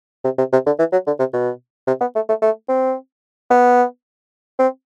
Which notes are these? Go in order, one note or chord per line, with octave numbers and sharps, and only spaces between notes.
C3
C3
C3
D3
E3
F#3
D3
C3
B2
C3
B3
A3
A3
A3
C4
B3
C4